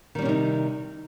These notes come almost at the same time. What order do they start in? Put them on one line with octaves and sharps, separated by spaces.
D#3 G3 C#4 C3 D#4